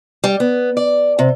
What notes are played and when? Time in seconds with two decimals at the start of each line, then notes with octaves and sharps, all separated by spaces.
0.24 G3
0.40 B3
0.77 D5
1.19 C3